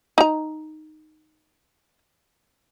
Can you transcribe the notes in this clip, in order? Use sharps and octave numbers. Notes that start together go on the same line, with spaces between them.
D#4 A#5